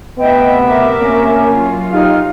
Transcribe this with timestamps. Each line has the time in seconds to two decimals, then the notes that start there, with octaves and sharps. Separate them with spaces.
0.18 D2 C3 B3 D#5 E5 G5
0.66 A#4 D6
1.00 A#3 C#4
1.52 F#3 F4
1.92 B1 D#4 G4 F5 F6